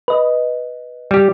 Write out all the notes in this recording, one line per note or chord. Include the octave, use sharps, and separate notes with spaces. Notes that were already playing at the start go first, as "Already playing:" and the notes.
B4 D#5
G3 G4